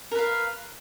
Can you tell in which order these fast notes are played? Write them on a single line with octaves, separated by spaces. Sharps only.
A#4 B4 F5